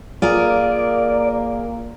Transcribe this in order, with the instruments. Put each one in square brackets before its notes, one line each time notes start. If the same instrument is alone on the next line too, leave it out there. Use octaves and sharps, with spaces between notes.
[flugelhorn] A#3 [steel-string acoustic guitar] F4 G#4 A#4 [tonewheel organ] D5